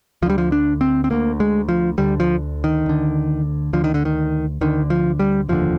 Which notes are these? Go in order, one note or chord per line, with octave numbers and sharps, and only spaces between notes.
D2 D3 F3 G3
F3
D4
C4
C4
D2 D3 A#3
G#3
F3
D2 D3 G3
F3
D#3
D2 D3
D2 D3 F3
D#3
D3
D#3
D2 D3 D#3
F3
G3
F1 D#2 D3 F3